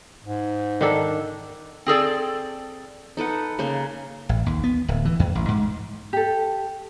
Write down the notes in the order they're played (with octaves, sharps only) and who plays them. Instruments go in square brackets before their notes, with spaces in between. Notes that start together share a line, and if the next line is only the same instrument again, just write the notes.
[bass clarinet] G#2
[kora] D#3 D4 A4
[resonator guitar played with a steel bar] C4 G#4 A4 D5
[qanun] D#4 A4 B4 F#5
C#3 A#3 C6
[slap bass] A1
D#2
B3
D1
E3
E2
A1
G#2
[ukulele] G4 A4